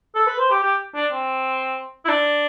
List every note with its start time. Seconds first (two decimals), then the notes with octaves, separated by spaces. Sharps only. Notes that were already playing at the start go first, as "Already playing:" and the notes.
0.15 A4
0.27 B4
0.39 C5
0.50 G4
0.63 G4
0.95 D4
1.12 C4
2.05 E4
2.08 D4